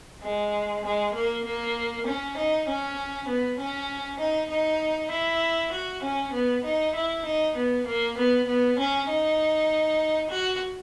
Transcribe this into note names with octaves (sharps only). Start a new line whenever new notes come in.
G#3
G#3
A#3
A#3
C#4
D#4
C#4
B3
C#4
D#4
D#4
E4
F#4
C#4
B3
D#4
E4
D#4
B3
A#3
B3
B3
C#4
D#4
F#4